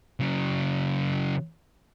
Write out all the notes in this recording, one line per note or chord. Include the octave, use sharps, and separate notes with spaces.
C#3 F#3